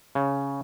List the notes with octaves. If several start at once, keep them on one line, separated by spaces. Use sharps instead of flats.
C#3